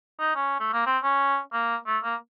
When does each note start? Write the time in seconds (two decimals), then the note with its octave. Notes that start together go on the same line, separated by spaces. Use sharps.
0.20 D#4
0.36 C#4
0.60 A3
0.73 A#3
0.86 C4
1.03 C#4
1.53 A#3
1.86 A3
2.03 A#3